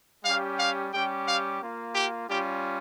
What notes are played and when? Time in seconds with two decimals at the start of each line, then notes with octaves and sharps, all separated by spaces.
0.24 G3 C#4 G4 F5
0.59 F5
0.93 G3 C#4 G4 G5
1.27 F5
1.61 A#3 F4
1.95 G4
2.29 G3 C#4 F4 G4